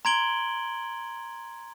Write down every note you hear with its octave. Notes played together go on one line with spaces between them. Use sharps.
A#5 C6 G#6 D7 F#7 G7